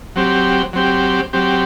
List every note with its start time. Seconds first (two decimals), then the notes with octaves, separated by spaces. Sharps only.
0.16 F#3 C4 G4
0.73 F#3 C4 G4
1.33 F#3 C4 G4